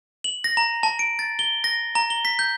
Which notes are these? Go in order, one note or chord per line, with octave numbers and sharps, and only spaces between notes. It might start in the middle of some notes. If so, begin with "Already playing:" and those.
F#7
A#6
A#5
A5
D7
A6
G7
A#6
A#5
G7
B6
G6